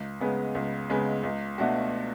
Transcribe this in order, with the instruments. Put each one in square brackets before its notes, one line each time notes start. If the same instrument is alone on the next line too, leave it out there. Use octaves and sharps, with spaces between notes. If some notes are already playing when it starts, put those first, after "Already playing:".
Already playing: [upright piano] C#2
C#3 G#3 B3
C#2
C#3 G#3 B3
C#2
B2 A3 D4 F#4